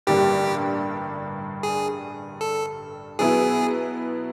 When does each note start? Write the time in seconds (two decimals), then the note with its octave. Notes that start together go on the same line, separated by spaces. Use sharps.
0.07 A1 G2 D3 G3 A#3 G4
1.63 G#4
2.41 A4
3.19 B2 F#3 B3 E4 G#4